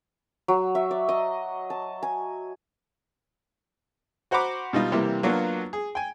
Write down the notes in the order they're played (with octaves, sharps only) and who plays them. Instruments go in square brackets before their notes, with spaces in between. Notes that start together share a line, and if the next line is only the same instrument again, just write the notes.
[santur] F#3
E5
D5
D#5
A5
G#5
[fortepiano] F#4 C5 F#5 A#5 B5 D6
B2 G3 D#4 F4
C3 E3 G3 A#3 G4
F#3 A#3 B3 D4 F4 F#4
G#4
G5 G#5